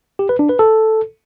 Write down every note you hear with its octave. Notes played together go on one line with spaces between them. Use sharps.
G4
B4
D4
B4
A4